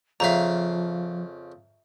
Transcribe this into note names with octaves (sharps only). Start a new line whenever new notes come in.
F2 C#3 F3 E5 F5 A#5